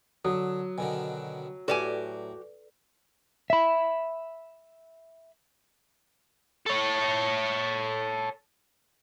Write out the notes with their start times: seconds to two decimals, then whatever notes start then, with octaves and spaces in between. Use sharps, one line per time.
0.25 D3 F#3 D#6
0.78 B2 D3 D#3 G#5
1.68 A2 F#4 G4 A4 B4 D5 G#5
3.50 E5 B5
6.66 A4 C#5